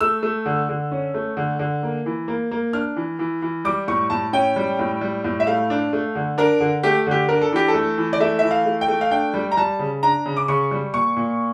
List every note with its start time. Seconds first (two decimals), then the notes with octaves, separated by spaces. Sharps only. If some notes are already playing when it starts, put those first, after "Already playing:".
0.01 A3 E6
0.23 A3
0.46 D3
0.69 D3
0.92 C#4
1.14 A3
1.37 D3
1.59 D3
1.83 A#3
2.06 E3
2.28 A#3
2.51 A#3
2.73 D4 F6
2.96 E3
3.19 E3
3.42 E3
3.65 G3 D6
3.88 A2 C#6
4.10 A2 A5
4.33 C#4 G5
4.56 G3
4.79 A2
5.01 G3
5.24 A2
5.40 E5
5.47 A3 F5
5.70 D4
5.93 A3
6.15 D3
6.38 D4 A#4
6.60 D3
6.83 A3 G4
7.07 D3 G4
7.29 D4 A#4
7.42 A4
7.52 E3 G4
7.68 A4
7.74 A3
7.98 E3
8.13 D5
8.20 A3 E5
8.39 E3 E5
8.51 F5
8.66 A3
8.81 G5
8.88 A3
9.01 F5
9.11 D4 G5
9.34 G3
9.52 A#5
9.57 G3 A5
9.79 C#3
10.03 D4 A#5
10.26 C#3
10.37 D6
10.48 C#3 C#6
10.71 G3
10.93 A#2 C#6
11.16 A#2